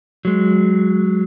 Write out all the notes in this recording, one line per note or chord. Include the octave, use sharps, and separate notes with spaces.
F#3 G#3